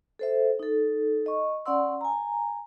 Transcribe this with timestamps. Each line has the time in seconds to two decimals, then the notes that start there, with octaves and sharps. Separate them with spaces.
0.19 A4 C5 E5
0.59 D#4 A4
1.26 D#5 C#6
1.66 C#4 D5 F#5 C6 E6
2.01 G#5 A#5